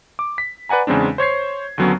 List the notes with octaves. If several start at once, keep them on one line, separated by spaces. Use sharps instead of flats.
D6
B6
B4 D5 F#5 G#5 A#5
E2 C#3 G#3 C4 D4
C5 C#5 G#6 C7
D#2 D3 F#3 B3 C#4